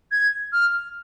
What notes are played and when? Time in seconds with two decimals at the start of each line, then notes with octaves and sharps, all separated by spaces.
0.12 G#6
0.53 F6